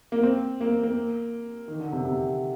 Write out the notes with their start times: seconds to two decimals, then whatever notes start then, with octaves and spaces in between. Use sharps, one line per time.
0.12 A#3
0.23 C4
0.61 A#3
0.83 A#3
1.68 D#3
1.80 D3
1.92 C3
2.05 C3